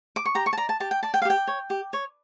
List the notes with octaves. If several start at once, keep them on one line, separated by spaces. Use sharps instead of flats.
D6
C#6
G4 A#5
C#6
A5
D5 A#5
A5
G4 A5
G5
D5 A5
G5
F5
G4 G5
C#5
G4
C#5